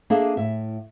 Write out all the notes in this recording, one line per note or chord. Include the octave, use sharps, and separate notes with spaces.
A#3 D4 G#4 A4 D#5 E5
A2 E5